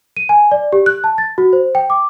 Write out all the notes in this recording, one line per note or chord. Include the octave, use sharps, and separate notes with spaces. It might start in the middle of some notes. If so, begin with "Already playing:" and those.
D#7
G#5
D5
G4
F#6
A5
A6
F#4
C5
G5
D6